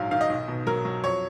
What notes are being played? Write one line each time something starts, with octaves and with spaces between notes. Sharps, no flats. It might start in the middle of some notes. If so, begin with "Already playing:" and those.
Already playing: A#1 G#2 F#3 F5
D#3 F5
D#5
B1
B2
F#3 A#4
F#3
F2 C#5